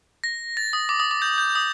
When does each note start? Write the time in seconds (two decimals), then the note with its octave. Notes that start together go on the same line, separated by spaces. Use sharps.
0.24 A#6
0.57 A6
0.73 D#6
0.89 D6
1.00 D#6
1.11 D6
1.22 G6
1.38 G6
1.55 D#6